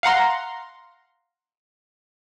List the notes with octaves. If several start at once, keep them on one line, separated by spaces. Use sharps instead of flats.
F5 F#5 A#5 C6